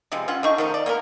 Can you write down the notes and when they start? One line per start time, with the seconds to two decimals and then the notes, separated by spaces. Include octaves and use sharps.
0.12 C3 E3 F3 G#3
0.28 C#4 F4 F#5
0.43 D3 D#4 C#6
0.58 D#3 F3 A3 D#4
0.74 D5
0.86 A#3 B3 A#4